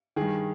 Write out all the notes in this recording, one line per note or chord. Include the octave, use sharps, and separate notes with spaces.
G2 D#3 G#4